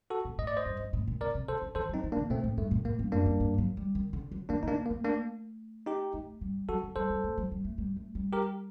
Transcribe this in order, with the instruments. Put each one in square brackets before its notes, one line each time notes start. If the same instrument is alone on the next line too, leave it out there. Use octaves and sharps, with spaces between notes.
[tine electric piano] F#4 A4
[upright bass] A#2
[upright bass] A2 [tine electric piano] D#5
[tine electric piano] D5
C5 D#5
[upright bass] G2
G2
A2
A#2
[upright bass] C3 [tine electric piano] A#4 D5
[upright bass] C3
[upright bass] D#3 [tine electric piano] A4 C5
[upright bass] D3
[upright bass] D#3 [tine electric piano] A4 C5
[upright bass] F#3 [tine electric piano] C4 D#4
[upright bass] D#3
[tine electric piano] A#3 D4
[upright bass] C3
[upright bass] A#2 [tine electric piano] A3 C4
[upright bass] A2
[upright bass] G2 [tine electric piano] A3
[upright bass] A#2
[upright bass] A2 [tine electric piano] A#3
[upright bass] G2
[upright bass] F#2 [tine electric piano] A#3 D4
[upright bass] G2
G2
F#3
G3
D#3
D3
F#3
[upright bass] D#3 [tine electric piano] A#3 D4
[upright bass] D3 [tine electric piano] D#4
[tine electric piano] A#3 D4
A#3
[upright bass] A3
[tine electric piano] A#3 D4
D#4 G4
[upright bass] A3
G3
[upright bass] F#3 [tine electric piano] F#4 A4
[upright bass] F#3
[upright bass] G3 [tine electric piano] A4 C5
[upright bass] G3
A3
F#3
G3
A3
G3
A3
G3
[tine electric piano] G4 A#4